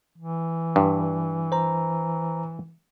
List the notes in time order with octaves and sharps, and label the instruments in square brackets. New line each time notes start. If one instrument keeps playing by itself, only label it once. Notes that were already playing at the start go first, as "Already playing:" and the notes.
[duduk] E3
[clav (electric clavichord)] G2
[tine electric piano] C5 A#5